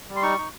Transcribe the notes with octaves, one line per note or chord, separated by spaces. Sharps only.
G3
C6
D#4 C#6
D#4